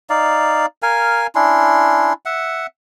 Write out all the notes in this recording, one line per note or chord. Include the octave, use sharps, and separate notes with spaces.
D#4 D5 F5
A#4 F5 G#5
C#4 D4 E4 C6
E5 F#5